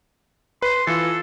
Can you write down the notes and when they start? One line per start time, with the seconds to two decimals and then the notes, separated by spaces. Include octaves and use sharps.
0.62 B4 C6
0.87 E3 F4 A4